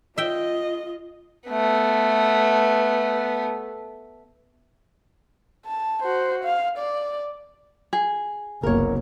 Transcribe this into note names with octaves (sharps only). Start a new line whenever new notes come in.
F4 D#5 E5 G5
A3 B3
A5
F#4 C5
F5
D5
G#4
F#1 C2 A#3 B3 A#4 C#5